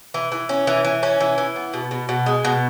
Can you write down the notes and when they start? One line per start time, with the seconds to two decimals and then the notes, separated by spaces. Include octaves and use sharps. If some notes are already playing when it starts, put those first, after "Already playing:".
0.14 E3
0.32 E3
0.49 C#4
0.67 E3
0.84 E3
1.03 C#4
1.20 E3
1.38 E3
1.56 B3
1.74 B2
1.91 B2
2.09 B2
2.26 G#3
2.45 B2